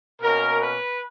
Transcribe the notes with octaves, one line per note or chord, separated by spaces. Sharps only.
B2 A#3 C#4 A#4
B4